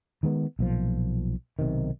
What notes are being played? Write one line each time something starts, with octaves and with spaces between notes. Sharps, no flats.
D#3 G#3 B3
B1 A#2 F3
B1 C3 D#3